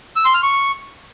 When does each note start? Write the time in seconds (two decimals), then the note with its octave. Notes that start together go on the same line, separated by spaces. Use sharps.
0.16 E6
0.25 C6
0.34 F6
0.43 C#6